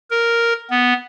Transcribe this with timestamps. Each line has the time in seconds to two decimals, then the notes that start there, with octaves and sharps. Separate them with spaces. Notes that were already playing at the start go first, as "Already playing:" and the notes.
0.11 A#4
0.70 B3